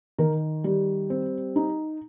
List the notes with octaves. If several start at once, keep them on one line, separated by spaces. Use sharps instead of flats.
D#3 A#4
G3 G4
C4
D#4